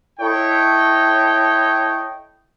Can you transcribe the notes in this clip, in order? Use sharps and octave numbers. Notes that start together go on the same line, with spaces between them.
E4 A4 C#5 D#5 G5